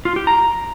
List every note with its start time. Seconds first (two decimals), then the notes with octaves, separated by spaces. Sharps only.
0.05 F4
0.16 G4
0.27 A#5